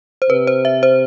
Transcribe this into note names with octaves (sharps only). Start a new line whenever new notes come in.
C5
C3 B4
C5
E5
C5